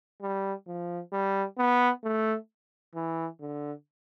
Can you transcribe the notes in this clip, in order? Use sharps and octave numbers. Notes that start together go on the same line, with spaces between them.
G3
F3
G3
B3
A3
E3
D3